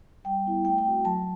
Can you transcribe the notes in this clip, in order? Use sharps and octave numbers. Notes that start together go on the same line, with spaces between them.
G3 G5
B3 E4
A3 G5
G5
C4 F#4
F#3 A5